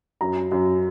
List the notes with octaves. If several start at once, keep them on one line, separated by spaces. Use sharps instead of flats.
F#2 A#5
F#2